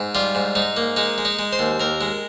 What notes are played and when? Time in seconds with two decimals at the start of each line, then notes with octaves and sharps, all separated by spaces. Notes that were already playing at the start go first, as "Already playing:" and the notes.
Already playing: G#2
0.15 G3 F4
0.35 G#2
0.55 G#2 D#4
0.77 A#3
0.97 G#3 D#4
1.18 G#3
1.25 D#4
1.39 G#3
1.53 C5
1.59 D#2
1.80 D#2 A#4
2.01 G#3